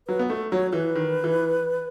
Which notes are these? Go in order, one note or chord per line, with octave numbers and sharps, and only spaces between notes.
F#3 B4
B3
A3 A4
F#3 C#5
E3 B4
D#3
E3